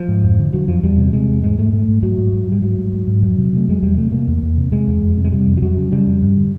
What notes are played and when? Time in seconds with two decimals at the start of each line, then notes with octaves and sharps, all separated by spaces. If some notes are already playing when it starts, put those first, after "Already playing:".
Already playing: F3
0.08 G#2
0.23 F2
0.39 D3
0.53 D3 F#3
0.68 F2 F3
0.83 E2 G3
0.98 C3
1.13 C3 G#3
1.28 E2
1.43 G#2 G#3
1.58 G#2 A3
1.73 G#2 A3
1.88 G#2
2.03 G#2 F#3
2.18 G#2
2.33 G#2
2.47 G#2 G3
2.62 G#2 F#3
2.78 G#2
2.93 G#2
3.07 G#2
3.23 F2 F#3
3.37 C3
3.53 C3 A3
3.68 F2 G#3
3.82 E2 G3
3.97 C3 A3
4.12 C3 A#3
4.27 E2
4.42 E2
4.57 C3
4.72 C3 G#3
4.87 E2
5.02 F2
5.17 C3
5.24 G#3
5.32 C3 G3
5.47 F2
5.57 F3
5.62 F2 F#3
5.77 C#3
5.92 C#3 G3
6.07 F2
6.22 G2
6.36 D3